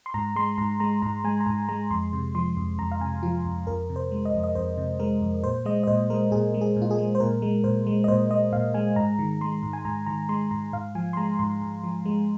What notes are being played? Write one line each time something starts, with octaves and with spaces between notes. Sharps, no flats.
C6
G#2 A#5
G#3 C6
G#2 A#5
G#3 A#5
G#2 A#5
G#3 G#5
A#5
G#2 G#5
G#3 A#5
F2 C6
C3
F3 C6
F2
F2 A#5
F5
C3 G#5
F3 F4
F2
F2 A#4
C3
C5
G#3
D#5
F2
D#5
F2 C5
C3
G#3 A#4
F2
A#2 C5
G#3 D#5
D#5
A#2 C5
G#3 A#4
A#2 G#4
G#3
G#4
A#2
F4
G#4
G#3
C5
A#2 A#4
G#3
A#2 C5
G#3
D#5
A#2 C5
G#3 D#5
A#2 F5
G#3 G#5
G#2 A#5
D#3
G#3 C6
G#2
G#5
G#2 A#5
D#3 A#5
G#3 C6
G#2 A#5
G#2 F5
F3 G#5
C6
G#3 A#5
G#2 C6
G#2
F3
G#3